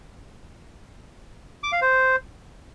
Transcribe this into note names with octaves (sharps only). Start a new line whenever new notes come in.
D6
F5
C5